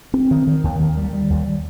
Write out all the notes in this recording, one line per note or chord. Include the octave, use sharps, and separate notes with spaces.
C4
D#3
D#3
D#2
D#3
G3
G3
D#2